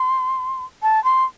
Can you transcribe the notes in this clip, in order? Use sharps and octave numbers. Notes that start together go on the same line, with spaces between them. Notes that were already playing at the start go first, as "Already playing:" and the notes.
Already playing: C6
A5
C6